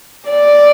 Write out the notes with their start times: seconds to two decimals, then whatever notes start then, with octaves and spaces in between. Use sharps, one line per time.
0.29 D5